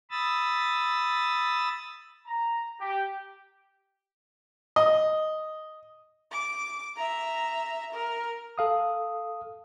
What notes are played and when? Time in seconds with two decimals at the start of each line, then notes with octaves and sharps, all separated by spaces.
0.11 B5 D#6 E6 A6
2.27 A#5
2.81 G4
4.76 D#5
6.32 D6
6.96 E5 A#5
7.92 A#4
8.58 A4 F5 D#6